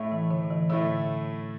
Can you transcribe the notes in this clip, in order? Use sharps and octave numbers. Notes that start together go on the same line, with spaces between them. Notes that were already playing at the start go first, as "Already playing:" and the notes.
Already playing: A2 A3 E4
E3
D3
E3
A2 D3 A3 E4